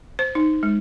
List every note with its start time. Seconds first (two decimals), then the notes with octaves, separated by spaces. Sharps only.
0.19 C5
0.35 D#4
0.63 G#3